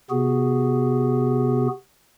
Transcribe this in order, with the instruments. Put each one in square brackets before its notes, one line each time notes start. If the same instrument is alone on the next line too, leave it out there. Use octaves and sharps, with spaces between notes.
[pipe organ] C3 B3 F#4 G#4